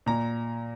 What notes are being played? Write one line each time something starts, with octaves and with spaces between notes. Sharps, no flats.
A#2 A#5